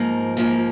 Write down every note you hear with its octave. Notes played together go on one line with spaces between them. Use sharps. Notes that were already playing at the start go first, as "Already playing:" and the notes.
Already playing: G#2 F3 A#3
G#2 F3 A#3